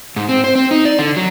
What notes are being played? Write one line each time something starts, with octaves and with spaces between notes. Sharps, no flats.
G#2
C4
C5
C4
D#4
D5
D3
F#3